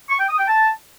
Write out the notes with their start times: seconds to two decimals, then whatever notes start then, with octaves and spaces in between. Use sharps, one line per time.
0.10 C#6
0.19 G5
0.29 D#6
0.38 G5
0.48 A5